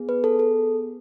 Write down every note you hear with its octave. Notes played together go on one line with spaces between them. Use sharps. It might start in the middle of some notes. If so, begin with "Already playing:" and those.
Already playing: B3 G#4
B4
A4
A4